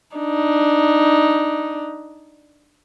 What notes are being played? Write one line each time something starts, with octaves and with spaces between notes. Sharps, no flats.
D4 D#4